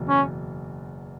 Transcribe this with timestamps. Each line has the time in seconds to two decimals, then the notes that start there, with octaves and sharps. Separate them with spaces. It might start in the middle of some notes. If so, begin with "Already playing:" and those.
Already playing: F#1 E2 B2
0.09 C#4